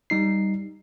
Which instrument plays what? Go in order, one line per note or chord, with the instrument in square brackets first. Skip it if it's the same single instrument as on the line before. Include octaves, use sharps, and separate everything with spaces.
[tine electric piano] G3 D#4 C7